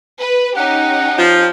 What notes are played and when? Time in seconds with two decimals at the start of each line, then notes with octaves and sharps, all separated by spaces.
0.19 B4
0.57 C#4 D#4 G4 F#5
1.19 F3